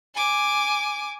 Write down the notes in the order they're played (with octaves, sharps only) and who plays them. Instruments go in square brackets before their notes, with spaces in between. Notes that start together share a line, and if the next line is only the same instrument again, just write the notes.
[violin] G#5 D6